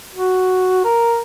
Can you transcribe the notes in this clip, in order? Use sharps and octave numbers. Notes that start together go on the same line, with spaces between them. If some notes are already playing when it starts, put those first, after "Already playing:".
F#4
A#4